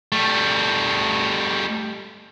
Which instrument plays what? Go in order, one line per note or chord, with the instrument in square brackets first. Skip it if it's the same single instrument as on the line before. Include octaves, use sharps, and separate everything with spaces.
[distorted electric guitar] G3 A3